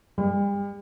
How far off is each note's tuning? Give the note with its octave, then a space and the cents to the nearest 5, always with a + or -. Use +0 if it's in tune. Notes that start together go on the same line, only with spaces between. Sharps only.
G3 +40